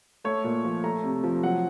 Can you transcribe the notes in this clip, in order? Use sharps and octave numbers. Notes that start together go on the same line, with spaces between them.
A3 C#5
A#2
F3
A3 A#5
C3
F3
F#3 F#5